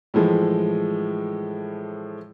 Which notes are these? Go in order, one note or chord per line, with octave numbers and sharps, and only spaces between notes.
A2 E3 F3 G#3